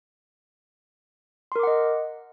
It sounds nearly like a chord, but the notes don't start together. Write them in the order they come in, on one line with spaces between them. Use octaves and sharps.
C6 A#4 D6 F#5 D#5